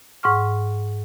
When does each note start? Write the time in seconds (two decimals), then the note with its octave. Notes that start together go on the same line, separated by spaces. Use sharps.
0.23 G#2 F#5 C#6 F6